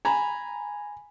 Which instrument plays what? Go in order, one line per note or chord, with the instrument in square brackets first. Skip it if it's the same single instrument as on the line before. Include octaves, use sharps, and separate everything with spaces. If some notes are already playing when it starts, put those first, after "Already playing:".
[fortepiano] G#5 A#5 B5